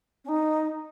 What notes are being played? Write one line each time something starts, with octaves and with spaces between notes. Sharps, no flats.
C#4
D#4